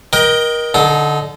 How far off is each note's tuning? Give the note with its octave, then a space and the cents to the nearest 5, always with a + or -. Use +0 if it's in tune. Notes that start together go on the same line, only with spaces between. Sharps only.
A#4 +25 D#5 +0 G5 +0
D3 +0 D#4 +0 A4 -35